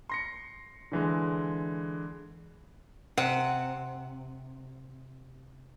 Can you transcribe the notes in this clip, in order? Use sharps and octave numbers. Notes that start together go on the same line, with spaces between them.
C6 A#6 C#7
D3 E3 G#3
C3 F#5